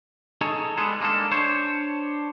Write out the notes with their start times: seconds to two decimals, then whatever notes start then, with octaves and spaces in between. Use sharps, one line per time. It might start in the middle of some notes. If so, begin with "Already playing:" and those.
0.41 D#4 G#4 A4 C#5
0.77 G3 G#3 B3 G#4 A4
1.00 G#3 A#3 C#4 D4 A4
1.31 D4 C5 C#5